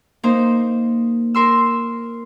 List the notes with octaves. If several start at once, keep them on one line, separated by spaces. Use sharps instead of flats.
A#3 D#4 C5
A#4 C6 E6